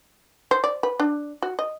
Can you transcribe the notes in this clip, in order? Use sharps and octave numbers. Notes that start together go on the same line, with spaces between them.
C5
D5
B4
D4
F#4
D#5